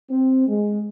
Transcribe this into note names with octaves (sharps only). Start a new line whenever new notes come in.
C4
G#3